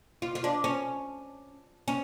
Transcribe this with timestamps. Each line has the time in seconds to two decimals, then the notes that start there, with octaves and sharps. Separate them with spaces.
0.22 F4
0.35 F4
0.44 D4
0.64 C#4
1.88 C#4